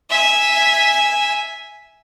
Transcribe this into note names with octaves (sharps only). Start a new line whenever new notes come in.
E5 G#5